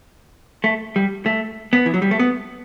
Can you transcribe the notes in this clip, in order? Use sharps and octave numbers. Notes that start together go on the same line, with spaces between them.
A3
G3
A3
B3
E3
F#3
G3
A3
B3